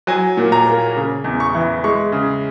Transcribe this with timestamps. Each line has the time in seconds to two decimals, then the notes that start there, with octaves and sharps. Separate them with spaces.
0.07 F#3 G#5
0.37 A#2
0.52 A#5
0.67 A#3
0.96 C#3
1.24 E2
1.40 C#6
1.55 E3
1.84 G#3 C#6
2.12 C#3